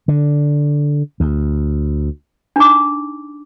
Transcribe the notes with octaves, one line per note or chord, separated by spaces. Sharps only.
D3
D2
D4 D#4 D6